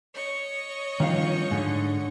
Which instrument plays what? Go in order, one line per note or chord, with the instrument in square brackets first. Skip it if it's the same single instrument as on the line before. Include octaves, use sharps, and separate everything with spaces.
[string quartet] C#5 D#5 C#6
[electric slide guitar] G2 F3 [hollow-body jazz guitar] D#3 F5
[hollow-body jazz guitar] G#2 [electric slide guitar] D3